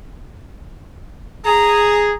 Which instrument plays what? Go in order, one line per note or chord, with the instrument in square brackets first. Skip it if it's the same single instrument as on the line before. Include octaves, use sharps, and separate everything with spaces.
[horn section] G#4 [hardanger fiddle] A#5